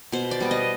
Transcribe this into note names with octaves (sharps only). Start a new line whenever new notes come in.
B2 C5
D5
G3 B3
D#5